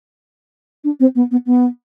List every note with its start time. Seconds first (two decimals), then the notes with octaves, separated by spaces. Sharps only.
0.84 D4
1.00 C4
1.15 B3
1.31 B3
1.46 B3